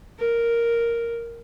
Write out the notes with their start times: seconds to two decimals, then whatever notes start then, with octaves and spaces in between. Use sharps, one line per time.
0.19 A#4